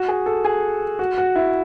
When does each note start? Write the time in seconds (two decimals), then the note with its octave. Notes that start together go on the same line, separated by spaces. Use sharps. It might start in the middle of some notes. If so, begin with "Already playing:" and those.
Already playing: F#4
0.08 G#4
0.26 A4
0.45 G#4
0.99 F#4
1.18 F#4
1.36 E4